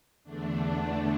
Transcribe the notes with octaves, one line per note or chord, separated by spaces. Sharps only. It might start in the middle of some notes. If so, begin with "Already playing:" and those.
E2 D3 A3 D4